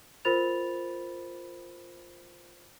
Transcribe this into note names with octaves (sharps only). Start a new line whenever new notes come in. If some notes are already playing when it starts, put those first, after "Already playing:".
F4 A#4 C5 B5 A6 F7